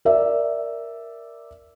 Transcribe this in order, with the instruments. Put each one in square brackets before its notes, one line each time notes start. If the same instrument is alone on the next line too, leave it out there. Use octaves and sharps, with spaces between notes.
[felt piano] A#4 D5 E5